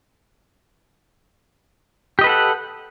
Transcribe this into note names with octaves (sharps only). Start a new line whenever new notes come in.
G4 A4 B4 D#5 F#5